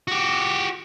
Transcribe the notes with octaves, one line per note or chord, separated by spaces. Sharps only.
F#4 G4